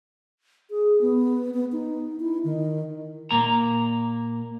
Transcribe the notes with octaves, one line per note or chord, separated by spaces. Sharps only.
G#4
B3
B3
D#4
E4
D#3
A#2 A#3 A#5